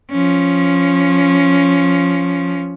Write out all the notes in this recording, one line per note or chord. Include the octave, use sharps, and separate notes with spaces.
F3 C#4